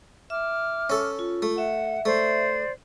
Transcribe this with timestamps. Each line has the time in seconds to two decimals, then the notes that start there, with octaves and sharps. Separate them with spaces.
0.30 E5 D6 F6
0.90 C#4 A4
1.19 F4
1.42 A3
1.58 E5 F#5
2.05 A3 C5 D5